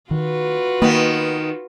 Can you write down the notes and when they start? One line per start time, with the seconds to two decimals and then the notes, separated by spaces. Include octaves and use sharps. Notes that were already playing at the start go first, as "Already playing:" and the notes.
0.11 D#3 F4 F#4 B4
0.82 D#3 A#3 B3